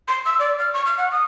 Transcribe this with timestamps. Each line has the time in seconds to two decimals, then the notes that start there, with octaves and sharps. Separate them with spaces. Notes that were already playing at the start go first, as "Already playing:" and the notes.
0.08 C6
0.25 E6
0.40 D5
0.59 F6
0.73 C#6
0.86 F6
0.98 F#5
1.12 D#6